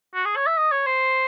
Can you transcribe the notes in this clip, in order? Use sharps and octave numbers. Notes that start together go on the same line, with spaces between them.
F#4
G#4
C#5
E5
D#5
C#5
C5